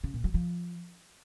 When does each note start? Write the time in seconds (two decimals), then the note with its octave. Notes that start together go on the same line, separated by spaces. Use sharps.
0.04 C#3
0.14 A#2
0.24 F#3
0.34 F3